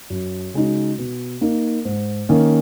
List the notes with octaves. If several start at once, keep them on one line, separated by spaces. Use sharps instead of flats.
F#2
C#3 G#3 D#4 F#4
B2
A#3 D#4
G#2
D#3 A#3 C#4